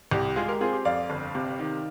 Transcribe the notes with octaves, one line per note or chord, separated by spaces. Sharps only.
C2 G4
G#3 F4 G#4
G4 A#4
C4 F4 G#4
G4
F2 D5 F5
G1
C3
D#3